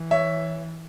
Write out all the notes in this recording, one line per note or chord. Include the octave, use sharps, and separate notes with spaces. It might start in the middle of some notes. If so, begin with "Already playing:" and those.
Already playing: E3
C#5 E5